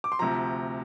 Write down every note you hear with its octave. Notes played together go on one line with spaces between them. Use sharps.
D6
C6
D2 C3 F3 A#5